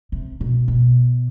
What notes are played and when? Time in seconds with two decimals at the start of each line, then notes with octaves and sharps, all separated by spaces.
0.12 C3
0.41 B2
0.68 B2